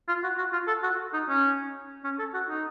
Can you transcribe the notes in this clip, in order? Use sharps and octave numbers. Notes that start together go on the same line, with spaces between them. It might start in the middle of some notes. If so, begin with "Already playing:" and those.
F4
F#4
F#4
F4
A4
F#4
D#4
C#4
C#4
A4
F#4
D#4